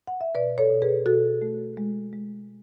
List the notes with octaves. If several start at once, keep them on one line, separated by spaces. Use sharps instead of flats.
F#5
E5
B2 B4 D5
A4 C#5
B2
G#4 B4
B2 F#4 A4
A3
G#3
G#3